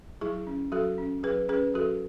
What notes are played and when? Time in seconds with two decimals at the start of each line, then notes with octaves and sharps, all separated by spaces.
0.21 F#3 E4 G#4
0.47 C#4
0.72 F#3 F#4 A4
0.98 C#4
1.23 F#3 G#4 B4
1.49 C#4 G#4 B4
1.74 F#3 F#4 A4